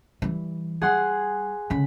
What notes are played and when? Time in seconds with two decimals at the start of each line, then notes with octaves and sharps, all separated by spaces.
0.22 E3 G3
0.82 G3 G#4 F#5 C6
1.70 C#2 D3 B5